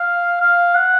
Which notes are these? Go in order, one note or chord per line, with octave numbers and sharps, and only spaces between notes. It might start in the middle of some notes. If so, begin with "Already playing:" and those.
Already playing: F5
F5
F#5